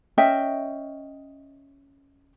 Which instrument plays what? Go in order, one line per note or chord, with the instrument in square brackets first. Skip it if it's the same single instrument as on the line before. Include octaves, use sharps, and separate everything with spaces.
[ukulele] C#4 D#5 E5 G5